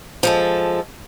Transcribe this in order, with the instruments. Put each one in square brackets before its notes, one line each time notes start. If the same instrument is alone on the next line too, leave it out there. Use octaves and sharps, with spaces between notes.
[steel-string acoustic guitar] F3 G#3 A4